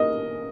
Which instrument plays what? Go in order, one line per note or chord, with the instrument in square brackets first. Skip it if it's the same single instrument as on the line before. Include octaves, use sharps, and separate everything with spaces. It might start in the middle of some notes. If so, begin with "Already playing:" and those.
Already playing: [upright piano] A#4 D#5